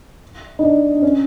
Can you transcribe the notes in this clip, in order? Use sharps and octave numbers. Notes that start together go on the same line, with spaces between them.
D#4
D4
D4
C#4